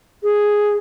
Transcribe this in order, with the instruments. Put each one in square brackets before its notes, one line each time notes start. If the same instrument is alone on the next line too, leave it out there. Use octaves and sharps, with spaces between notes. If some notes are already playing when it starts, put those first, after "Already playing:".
[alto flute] G#4